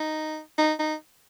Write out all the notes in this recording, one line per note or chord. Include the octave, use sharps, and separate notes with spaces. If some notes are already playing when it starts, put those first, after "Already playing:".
Already playing: D#4
D#4
D#4